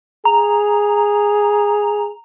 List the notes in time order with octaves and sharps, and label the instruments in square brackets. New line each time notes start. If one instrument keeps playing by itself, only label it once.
[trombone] G#4 [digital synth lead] A#5